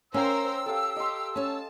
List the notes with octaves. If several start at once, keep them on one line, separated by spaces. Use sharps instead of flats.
C#4 A#4 C5 F5 G5 A#5 C6 E6
G4 A4 F5
G4 D#5 C6
C#4 C#5 A5